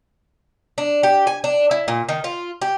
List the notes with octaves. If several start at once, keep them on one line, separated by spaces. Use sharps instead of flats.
D4
G4
G#5
D4
E4
A#2
D#3
F4
G4